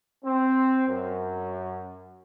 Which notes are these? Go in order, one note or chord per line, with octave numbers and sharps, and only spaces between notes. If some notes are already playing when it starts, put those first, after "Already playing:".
C4
F#2